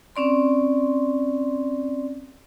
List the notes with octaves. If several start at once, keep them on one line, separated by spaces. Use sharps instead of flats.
C4 C#4 D5 C6